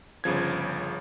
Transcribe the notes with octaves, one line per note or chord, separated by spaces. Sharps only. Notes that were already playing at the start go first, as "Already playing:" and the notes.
G1 C#3 F3 G#6